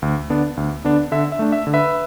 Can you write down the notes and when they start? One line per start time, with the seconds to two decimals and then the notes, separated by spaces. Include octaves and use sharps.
0.02 D2
0.30 D3 B3 D4
0.57 D2
0.84 D3 B3 D4
1.12 D3 E5
1.32 E5
1.39 A3 D4
1.52 E5
1.67 D3
1.74 B4 E5